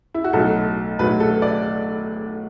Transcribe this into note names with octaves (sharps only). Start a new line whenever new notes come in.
E4
F#4
B1 A2 F#3 A4
B1 A2 F#3 B4
A4
D5